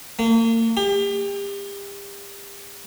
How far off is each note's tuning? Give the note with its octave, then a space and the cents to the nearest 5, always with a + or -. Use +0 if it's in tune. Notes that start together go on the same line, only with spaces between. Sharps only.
A#3 -40
G4 +35